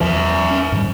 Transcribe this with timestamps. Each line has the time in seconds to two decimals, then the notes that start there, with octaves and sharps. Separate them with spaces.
0.01 E2 F3 A#4 E5
0.51 C#4
0.72 G#2 D#3 G3